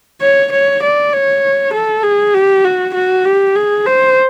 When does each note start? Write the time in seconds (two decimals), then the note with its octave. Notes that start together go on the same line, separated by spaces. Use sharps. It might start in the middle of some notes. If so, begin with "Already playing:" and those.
0.21 C#5
0.52 C#5
0.82 D5
1.13 C#5
1.73 A4
2.03 G#4
2.34 G4
2.65 F#4
2.94 F#4
3.25 G4
3.56 G#4
3.86 C5